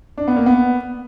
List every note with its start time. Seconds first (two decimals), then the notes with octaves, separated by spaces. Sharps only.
0.18 D4
0.28 B3
0.36 A#3
0.46 B3